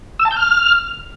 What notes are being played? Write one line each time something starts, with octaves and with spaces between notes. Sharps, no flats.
E6
A5
G6
F6